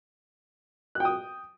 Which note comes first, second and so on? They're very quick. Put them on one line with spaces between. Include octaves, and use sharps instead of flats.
F#6 G5 D#6